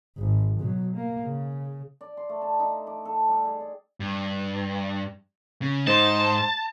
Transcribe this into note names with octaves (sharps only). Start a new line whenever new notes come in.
G#1
B2 F#3
A#3
C#3
D5
C6
A3
A5
D#4
D6
A4
G3
G#4
D5
G2
C#3
G#2 D#4 C5 A5